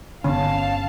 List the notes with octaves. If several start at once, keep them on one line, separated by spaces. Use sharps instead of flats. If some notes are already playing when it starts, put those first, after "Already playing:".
G1 D3 B3 C#4 F5 A5